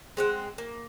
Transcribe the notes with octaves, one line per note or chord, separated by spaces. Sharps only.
G#3 C4 F#5
A#3